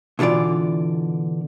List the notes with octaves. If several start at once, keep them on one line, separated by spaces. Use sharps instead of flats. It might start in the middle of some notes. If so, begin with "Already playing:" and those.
B2 D3 E3 F4 D5